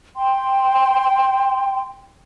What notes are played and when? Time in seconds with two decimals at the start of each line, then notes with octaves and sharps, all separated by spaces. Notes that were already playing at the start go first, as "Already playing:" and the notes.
0.16 G5 C6